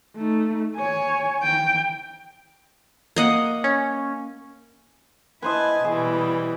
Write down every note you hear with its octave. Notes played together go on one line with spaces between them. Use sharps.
A3 D#4
C#5 G#5
G5
A#3 D#5 F#5
C#4
E4 B4 C5 D#5 G#5 A5
B2 E3 G3 G#4